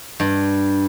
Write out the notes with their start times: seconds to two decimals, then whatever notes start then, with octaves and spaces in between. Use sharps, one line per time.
0.20 G2